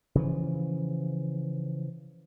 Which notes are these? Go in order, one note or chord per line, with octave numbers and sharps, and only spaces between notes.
C#3 E3 F3